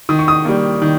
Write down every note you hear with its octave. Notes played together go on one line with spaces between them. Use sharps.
D#3 D#6
C#6
D#6
G3 A#3
D#3